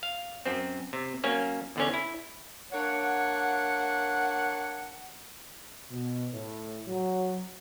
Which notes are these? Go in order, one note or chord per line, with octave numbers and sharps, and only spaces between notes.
F5
F#2 C4
C3
F#3 A#3 C#4
E2 D3 C#4
E4
A#3 D4 C#5 F#5
B2
A2
F#3